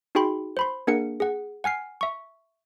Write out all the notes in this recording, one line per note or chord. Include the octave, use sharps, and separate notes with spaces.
D#4 F#4 G#4 G5 B5 C6
C5 B5 C6
A#3 D4 G#4 A#4 F#5 C#7
G#4 F#5
F#5 G#5 F6 C7
E5 C#6